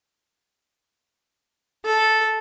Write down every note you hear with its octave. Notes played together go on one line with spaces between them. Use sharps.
A4